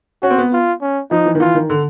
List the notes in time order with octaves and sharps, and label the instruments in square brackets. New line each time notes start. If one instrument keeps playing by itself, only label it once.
[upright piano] C#4 [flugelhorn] F#4
[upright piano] C4
B3
[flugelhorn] F4
C#4
[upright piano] F3 [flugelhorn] D#4
[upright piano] E3
D#3
[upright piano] E3 [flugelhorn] F4
[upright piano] D#3
D3